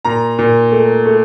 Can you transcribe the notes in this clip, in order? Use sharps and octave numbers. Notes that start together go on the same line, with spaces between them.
A#2 A#5
A#2
A3
A3